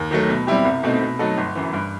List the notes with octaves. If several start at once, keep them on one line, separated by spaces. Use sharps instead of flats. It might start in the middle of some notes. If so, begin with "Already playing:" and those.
Already playing: D#2
D#3 F#3 A3
B2
G3 C4 E4 G4
C2
B2 A3 C4 D#4
B2
F#3 A3 D#4 A4
G1
F#2 E3
G2